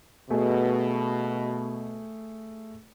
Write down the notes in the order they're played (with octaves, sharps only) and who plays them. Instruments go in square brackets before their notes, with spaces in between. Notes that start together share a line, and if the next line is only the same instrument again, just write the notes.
[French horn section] B2 [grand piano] A3 G#4